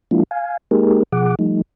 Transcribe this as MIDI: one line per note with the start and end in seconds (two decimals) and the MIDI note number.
0.11 0.23 53
0.11 0.23 56
0.11 0.23 58
0.11 0.23 62
0.11 0.23 64
0.11 0.23 65
0.31 0.57 77
0.31 0.57 80
0.71 1.03 56
0.71 1.03 58
0.71 1.03 63
0.71 1.03 67
0.71 1.03 68
0.71 1.03 70
1.12 1.35 47
1.12 1.35 53
1.12 1.35 68
1.12 1.35 78
1.12 1.35 86
1.39 1.62 53
1.39 1.62 55
1.39 1.62 57
1.39 1.62 63